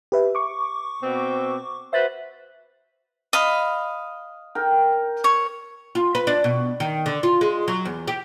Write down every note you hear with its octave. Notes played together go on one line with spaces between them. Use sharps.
G4 B4 E5
C#6 D6
B2 C4
F#4 B4 C5 E5 A6
D#5 F5 B5
A#4 G5
C#5
F4
B4
D4
B2
D#3
D3
F4
G#3
F#3
E2
G4